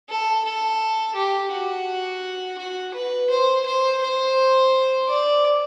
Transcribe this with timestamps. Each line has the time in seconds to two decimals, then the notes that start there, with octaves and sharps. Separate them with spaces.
0.09 A4
0.45 A4
1.15 G4
1.51 F#4
2.58 F#4
2.94 B4
3.30 C5
3.66 C5
4.01 C5
5.09 D5